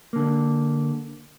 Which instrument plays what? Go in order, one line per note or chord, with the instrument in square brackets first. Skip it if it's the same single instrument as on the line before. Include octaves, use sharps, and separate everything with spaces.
[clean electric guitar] D3 A#3